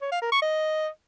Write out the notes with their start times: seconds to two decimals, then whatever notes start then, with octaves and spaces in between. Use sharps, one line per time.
0.02 C#5
0.12 F5
0.22 A#4
0.32 C#6
0.42 D#5